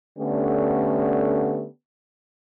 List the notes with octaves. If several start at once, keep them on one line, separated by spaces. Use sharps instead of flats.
D3 A3 B3 C#4 D4 G4